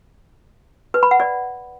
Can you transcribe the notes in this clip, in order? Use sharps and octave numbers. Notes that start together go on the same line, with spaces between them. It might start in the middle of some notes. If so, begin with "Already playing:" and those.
B4
B5
F#5
D5